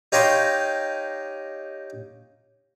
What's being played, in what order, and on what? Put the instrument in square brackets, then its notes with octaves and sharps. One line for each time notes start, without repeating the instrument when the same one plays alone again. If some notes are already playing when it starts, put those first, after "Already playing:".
[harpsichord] D#4 G4 C#5 D#5 F5 C6